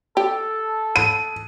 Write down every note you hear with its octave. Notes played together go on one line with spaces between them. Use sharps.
G4 A4
D#7